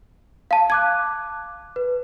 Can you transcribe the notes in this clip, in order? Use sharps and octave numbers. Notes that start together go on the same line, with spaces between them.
F5 A5
A5 D6 F#6 G#6
B4